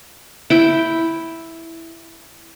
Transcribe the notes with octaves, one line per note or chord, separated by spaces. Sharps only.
E4 G5